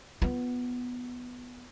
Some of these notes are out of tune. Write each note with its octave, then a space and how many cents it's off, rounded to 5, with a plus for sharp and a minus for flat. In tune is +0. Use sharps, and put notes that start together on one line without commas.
B3 +0 F4 +0